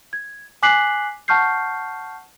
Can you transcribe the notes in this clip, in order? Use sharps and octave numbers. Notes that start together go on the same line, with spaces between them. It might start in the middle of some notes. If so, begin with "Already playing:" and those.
G#6
G#5 D6 F#6 B6 C7 F#7
F#5 A5 C#6 F6 G6 C7